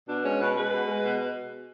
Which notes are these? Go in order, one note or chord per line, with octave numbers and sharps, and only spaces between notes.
B2 D4
G#3 C#4
B2 B4
G#3 B4
B2
G#3
B2